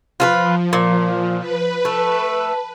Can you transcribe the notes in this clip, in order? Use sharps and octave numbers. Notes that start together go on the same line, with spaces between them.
F3 F4 A4 B4
A#2
B4
A3